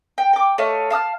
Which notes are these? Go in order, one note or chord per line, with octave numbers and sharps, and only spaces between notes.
G5
G5 D6
A3 C#5 D#5 F5
F5 A5 D#6 F6